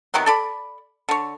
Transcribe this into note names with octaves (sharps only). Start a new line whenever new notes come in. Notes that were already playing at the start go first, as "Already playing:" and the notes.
C3 D#3 F#3 B3
A4 D5 B5
D3 C#5